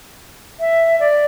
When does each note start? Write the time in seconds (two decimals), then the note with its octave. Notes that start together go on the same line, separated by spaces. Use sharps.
0.60 E5
0.99 D5